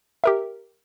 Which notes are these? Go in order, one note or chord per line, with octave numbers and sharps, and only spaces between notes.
G4 A#4 E5